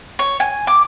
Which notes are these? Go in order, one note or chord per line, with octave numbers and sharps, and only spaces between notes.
C#5
G#5
D6